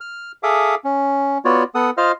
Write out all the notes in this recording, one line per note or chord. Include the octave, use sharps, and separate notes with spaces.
F6
G#4 A4 E5 F5 D6 D#6
C#4
B3 F4 F#4 C#5 D5
B3 A4 F#5 D#6
F4 C5 D#5 F5 F6